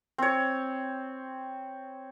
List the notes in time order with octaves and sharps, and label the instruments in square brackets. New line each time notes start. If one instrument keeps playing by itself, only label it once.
[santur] C4 C#5